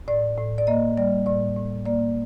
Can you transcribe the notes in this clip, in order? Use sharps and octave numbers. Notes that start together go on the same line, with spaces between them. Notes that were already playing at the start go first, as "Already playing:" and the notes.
A2 D5
A2
D5
A#3 D#5
G3 D5
A2 D5
A2
A#3 D5